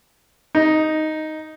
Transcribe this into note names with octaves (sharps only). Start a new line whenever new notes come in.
D#4